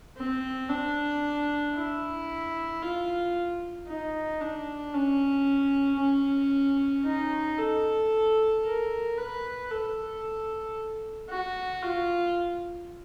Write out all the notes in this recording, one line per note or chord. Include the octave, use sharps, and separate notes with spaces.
C4
D4
E4
F4
D#4
D4
C#4
C#4
D#4
A4
A#4
B4
A4
F#4
F4